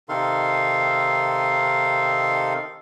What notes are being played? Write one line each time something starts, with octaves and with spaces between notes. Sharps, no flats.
C3 D#3 D#4 A4 F5 C6